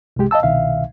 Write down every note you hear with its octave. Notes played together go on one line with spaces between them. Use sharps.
C2 F#2 C3 G#3 G4
D#5 F5 A5 E6
C2 B2 D#3 E5 F5